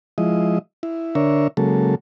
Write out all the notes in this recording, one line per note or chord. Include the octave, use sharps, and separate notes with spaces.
F3 G#3 E4 D#5
E4
D3 D4 A#4 C#5 E5
C#3 F#3 G#3 A#3 A4